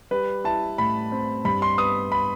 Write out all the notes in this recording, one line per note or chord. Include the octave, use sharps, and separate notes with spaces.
G3 B4
E4 A5
A2 B5
C4
G2 B5
C6
B3 D#6
B5